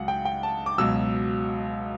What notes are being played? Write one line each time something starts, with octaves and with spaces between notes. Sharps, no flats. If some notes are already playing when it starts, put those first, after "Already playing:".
Already playing: C#2 C#3 F#3 F#5
G5
G5
A5
D6
C#2 B2 F#3 E6